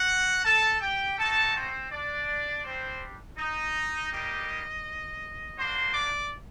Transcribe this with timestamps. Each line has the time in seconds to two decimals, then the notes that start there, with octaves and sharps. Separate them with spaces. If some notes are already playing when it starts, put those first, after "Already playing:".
Already playing: F#4 F#5
0.45 A4 A5
0.81 G4 G5
1.18 A3 D#4 F#4 A4 A5
1.55 C4 C5
1.91 D4 D5
2.64 G3 C4 D4 G4 C5
3.38 D#4 D#5
4.11 G3 A#3 D#4 G4
5.57 A#3 D4 F#4 C5 C6
5.94 D5 D6